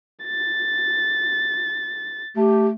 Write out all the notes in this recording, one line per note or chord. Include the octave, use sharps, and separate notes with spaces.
A6
A3 G4